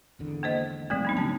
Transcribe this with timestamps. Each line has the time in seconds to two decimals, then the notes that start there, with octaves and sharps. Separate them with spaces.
0.19 G#1 E2 D3
0.43 A#3 C5 D#5
0.90 E1 C2 G#2 F3 A3 C4
1.05 B3 D4 D#4
1.17 C#3 F#3 C#4 A5